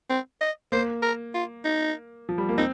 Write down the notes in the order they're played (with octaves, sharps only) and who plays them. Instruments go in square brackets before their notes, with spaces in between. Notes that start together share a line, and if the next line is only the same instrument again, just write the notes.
[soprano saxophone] C4
D#5
[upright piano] A#3 [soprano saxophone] C5
[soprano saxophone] A#4
F4
D#4
[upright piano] F3
G3
A#3
[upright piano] C4 [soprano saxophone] D#4